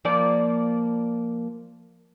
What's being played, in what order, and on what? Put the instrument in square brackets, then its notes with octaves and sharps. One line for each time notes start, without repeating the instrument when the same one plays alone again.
[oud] F3 A#3 D5